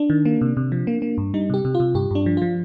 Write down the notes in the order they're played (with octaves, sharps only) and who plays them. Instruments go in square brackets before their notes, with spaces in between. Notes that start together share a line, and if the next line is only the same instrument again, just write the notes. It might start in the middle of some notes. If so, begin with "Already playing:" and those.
Already playing: [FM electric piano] D4
D#3
A#3
C3
C3
F3
A#3
A#3
G2
G3 D#4
C3 G4
C3
F4
C3
G2 G4
G2 D4
F3
F3 F4